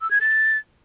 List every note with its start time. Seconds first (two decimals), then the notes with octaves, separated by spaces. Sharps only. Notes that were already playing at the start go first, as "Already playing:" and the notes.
0.01 E6
0.11 G#6
0.21 A6